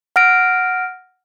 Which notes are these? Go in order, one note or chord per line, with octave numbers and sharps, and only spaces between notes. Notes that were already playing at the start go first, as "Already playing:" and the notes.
F#5 F6 A#6 D7